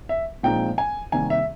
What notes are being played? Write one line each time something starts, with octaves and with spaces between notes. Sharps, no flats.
E5
A#2 F3 G#3 C4 D#4 G5
G#5
C3 D#3 G3 A#3 G#5
E5